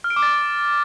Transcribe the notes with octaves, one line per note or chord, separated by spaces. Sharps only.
F6
D7
D6
A6